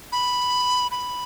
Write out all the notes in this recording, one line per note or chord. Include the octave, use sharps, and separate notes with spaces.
B5
B5